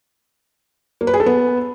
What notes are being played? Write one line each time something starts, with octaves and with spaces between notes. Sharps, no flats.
A#3
B4
G#4
A4
B3